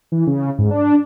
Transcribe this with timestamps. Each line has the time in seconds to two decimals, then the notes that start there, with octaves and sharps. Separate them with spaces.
0.12 E3
0.27 C#3
0.58 G#2
0.70 D4